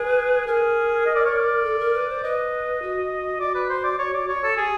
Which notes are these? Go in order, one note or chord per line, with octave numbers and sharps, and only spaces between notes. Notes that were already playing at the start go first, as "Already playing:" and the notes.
Already playing: G#4 B4
G#4 A#4
D#5
D5
C#5
D5
A4
A#4
B4
C5
B4 D#5
F#4
F#4 D5
B4
C5
D5
C#5
D5
C#5
A4
G4 G#4